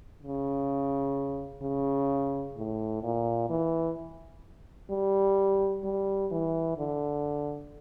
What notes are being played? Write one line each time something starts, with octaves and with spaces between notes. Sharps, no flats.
C#3
C#3
A2
A#2
E3
G3
G3
E3
D3